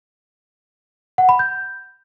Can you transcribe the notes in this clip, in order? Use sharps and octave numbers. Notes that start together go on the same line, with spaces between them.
F#5
B5
G6